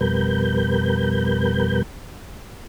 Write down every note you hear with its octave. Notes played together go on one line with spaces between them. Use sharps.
F2 B2 G3 A#4 B4 G6